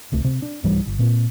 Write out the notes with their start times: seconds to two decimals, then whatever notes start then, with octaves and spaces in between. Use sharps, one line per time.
0.12 D1 C2 A3
0.24 C3
0.42 D4
0.63 C2 G#2 E3 G3
0.87 G1
0.99 A#2 C4